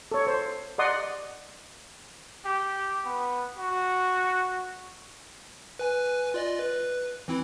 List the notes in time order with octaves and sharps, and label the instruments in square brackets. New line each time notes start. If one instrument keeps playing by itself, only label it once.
[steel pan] A4 C#5
C5
D5 D#5 F#5 C6 D#6
[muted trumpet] G4
B3
F#4
[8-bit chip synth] B4 G#5
F4 D5 D#5
B4
E3 C4 E4